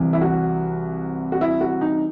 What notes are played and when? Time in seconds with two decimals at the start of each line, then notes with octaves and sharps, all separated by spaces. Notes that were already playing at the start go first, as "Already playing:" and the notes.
Already playing: C2 C3 E3
0.13 E4
0.21 F#4
1.32 F#4
1.41 E4
1.61 F#4
1.81 D#4